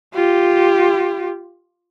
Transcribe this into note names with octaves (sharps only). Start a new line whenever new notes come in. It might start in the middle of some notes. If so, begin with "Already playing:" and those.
F4 G4